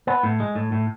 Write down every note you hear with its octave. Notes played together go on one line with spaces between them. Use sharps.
B3
A2
G#3
A2
A2